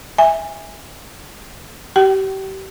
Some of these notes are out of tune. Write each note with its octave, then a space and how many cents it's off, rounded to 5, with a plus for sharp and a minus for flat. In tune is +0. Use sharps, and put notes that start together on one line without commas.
E5 -15 G#5 -20
G4 -30 G5 -35